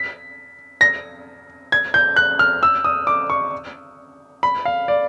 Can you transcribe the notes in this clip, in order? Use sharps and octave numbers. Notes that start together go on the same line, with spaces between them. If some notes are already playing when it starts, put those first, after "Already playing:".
Already playing: B6
A#6
G#6
G6
F#6
F6
E6
D#6
D6
C#6
B5
F5
D5